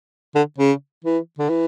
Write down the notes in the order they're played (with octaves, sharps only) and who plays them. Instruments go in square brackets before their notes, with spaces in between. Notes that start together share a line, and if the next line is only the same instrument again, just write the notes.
[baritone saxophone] D3
C#3
E3
D3
E3